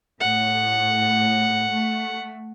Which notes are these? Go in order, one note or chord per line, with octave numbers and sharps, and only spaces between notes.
A2 F#5
A3